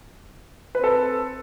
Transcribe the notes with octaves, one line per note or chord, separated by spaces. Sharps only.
C4 A4 B4